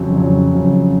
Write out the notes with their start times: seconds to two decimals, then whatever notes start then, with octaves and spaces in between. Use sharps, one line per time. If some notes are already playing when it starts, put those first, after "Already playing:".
Already playing: F2 C#3 F#3
0.16 F2 C#3 F#3
0.52 F2 C#3 F#3